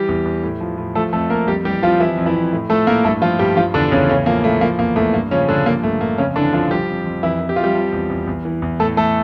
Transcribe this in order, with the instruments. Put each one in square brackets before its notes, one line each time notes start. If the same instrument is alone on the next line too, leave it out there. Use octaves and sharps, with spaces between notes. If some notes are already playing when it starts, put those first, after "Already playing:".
Already playing: [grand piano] E3 G3 G4
E2
E2
A2
F3
A2
F3 A3 A4
F2 A3 A4
F2 A#3 A#4
F2 G3 G4
E3 G3 G4
F2 F3 F4
E3 F3 E4
F2
E3 E4
F2
A2
F3 A3 A4
A2 A#3 A#4
G2 A3 A4
F3 F4
G2 G3 G4
F3 F4
E2 D3 D4
E2 C#3 C#4
A2 C#3 C#4
F3 A#3
A2 A3
F3 A#3
E2 A#3
E2 A3
G2 A#3
C#3 F3 C#4
G2 D3 D4
F3 A#3
G2 A3
G2 A#3
F2 C#3 C#4
D3 E3 D4
F2 F3 F4
F3 G3 G4
F2
F2
F2 E3 E4
E3
G4
F2 F4
G3 G4
F3
E2
E2
E2
E3
E2
A2 A3 A4
E3 A3 A4